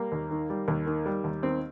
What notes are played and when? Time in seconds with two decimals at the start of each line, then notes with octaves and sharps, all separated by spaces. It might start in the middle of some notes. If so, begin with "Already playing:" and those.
Already playing: G3 A#3
0.12 D#2
0.31 D#3
0.50 G3
0.68 D#2
0.86 D#3
1.06 G3
1.24 D#2
1.43 D#3 C4